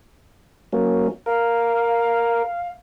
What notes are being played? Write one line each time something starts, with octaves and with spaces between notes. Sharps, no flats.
F#3 A#3 C#4
A#4 F5